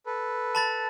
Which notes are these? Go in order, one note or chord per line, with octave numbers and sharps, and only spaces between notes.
A4 B4
A5 B5 A6